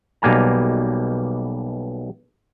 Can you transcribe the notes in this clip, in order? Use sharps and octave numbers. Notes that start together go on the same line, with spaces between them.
B1 B2 G3 A#3 G#5 A#5